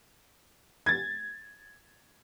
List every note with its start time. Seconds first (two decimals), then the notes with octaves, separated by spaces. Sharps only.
0.86 G#6 A6